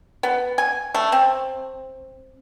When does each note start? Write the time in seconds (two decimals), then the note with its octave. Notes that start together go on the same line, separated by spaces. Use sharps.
0.23 B3
0.58 G#5
0.94 A3
1.12 C4